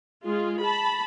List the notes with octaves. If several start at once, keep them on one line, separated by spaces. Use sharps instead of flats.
G#3 F4 G#4
A5 B5